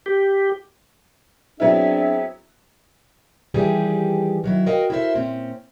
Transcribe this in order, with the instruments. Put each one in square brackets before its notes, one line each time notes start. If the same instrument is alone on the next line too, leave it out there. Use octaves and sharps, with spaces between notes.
[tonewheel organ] G4
[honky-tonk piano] F#3 B3 E4 [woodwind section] C4 G#4 E5 [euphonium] D4
[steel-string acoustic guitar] D#3 E3 G3 G4 G#4 B4
D#3 F#3 E4
F#4 A#4 B4 D#5 F5 G5
E4 F#4 A4 A#4 C5 E5
A#2 C4 C#4